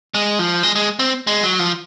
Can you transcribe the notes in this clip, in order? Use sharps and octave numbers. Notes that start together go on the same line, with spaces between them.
G#3
F3
G#3
G#3
C4
G#3
F#3
F3